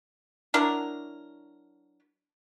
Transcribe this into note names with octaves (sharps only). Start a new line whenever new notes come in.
F#3 D4 E4 A#4